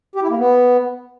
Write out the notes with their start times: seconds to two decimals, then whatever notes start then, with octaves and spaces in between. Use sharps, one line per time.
0.15 G4
0.23 E4
0.30 A#3
0.37 B3